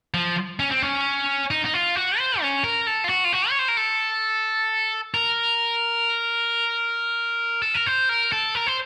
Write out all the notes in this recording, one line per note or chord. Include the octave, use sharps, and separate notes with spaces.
F3
C#4
C4
C#4
D#4
D#4
F4
F#4
C5
C#4
A#4
A4
F4
F#4
F4
F#4
C#5
C5
A#4
A4
A#4
A4
A#4
C5
A#4
A4
A#4
C5